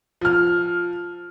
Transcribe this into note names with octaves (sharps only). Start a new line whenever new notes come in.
F3 F6